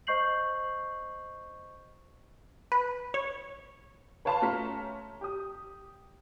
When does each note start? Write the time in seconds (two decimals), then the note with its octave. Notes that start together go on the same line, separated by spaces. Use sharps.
0.07 C5 D#5 C#6 G6 C7 F#7
2.72 B4
3.14 C#5
4.25 B4 C#5 F5 A5 B5 C6
4.42 A3 C#4 F4 A#5 F6 B6
5.21 G4 D#6